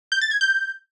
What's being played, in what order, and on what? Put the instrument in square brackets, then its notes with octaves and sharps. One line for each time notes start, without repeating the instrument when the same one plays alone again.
[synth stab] G6
A6
G#6
G6